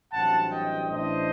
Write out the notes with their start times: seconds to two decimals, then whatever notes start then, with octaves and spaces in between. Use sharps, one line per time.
0.13 A1 G2 F#3 C4 F#5 A5
0.51 D#5 G5
0.89 A1 A2 A3 D4 C5 D#5